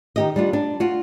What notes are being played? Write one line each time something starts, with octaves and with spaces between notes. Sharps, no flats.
D#3 G4 D#5
G3 D4 F4
D4
F4 F#4